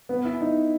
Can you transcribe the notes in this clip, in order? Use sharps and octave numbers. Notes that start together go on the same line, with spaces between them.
B3
E4
D#4